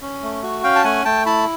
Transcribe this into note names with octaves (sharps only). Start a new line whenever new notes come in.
C#4
A3
F#4
C#4 F5 G5
A5
A3 F#5 G#5
A3 G5 A5
E4 A5 B5